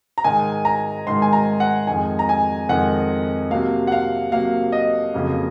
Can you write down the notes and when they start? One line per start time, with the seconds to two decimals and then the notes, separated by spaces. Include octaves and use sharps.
0.18 A#5
0.24 G#2 D#3 G#3 G#5
0.65 A#5
1.07 G#2 D#3 G#3 C6
1.22 G#5
1.33 A#5
1.60 F#5
1.87 F2 D#3 G#3 G#5
2.19 A#5
2.29 G#5
2.69 F2 D#3 G#3 F#5
3.51 C3 F#3 A#3 F5
3.87 F#5
3.92 F5
4.32 C3 F#3 A#3 F5
4.72 D#5
5.14 F2 C#3 F#3 A#3